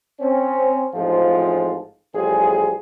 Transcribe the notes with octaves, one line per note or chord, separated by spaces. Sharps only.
C4 C#4
A1 G#2 F3 G#3 C4 F4
A1 F3 G3 G#4